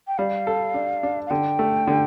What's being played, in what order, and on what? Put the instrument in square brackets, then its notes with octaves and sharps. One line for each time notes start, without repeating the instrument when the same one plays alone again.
[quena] G5
[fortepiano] G3 [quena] F5
[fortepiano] A4
D4
D4
[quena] F5
[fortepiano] D3 [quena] G5
[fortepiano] A3
D3